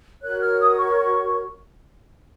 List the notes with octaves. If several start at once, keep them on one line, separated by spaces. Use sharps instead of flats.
F#4 A#4 C#5 F#6
F6
D#6
C#6
C#6